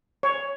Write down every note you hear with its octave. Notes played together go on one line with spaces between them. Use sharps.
C#5